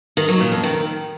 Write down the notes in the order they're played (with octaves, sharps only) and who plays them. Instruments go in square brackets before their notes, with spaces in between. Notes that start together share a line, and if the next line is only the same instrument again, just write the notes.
[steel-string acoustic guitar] D#3
F#3
A#2
F2
D#3